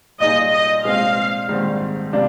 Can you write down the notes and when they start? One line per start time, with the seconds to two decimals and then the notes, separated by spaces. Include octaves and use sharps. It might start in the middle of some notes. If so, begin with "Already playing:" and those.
0.20 A#2 G3 A#3 D#4 G#4 D#5
0.52 D#5
0.84 A#2 G#3 C4 F4 F5
1.48 A#1 G#2 D#3 G3 C4
2.13 C3 G3 A#3 D4